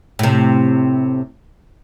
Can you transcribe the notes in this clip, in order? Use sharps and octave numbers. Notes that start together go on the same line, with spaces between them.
A2 C3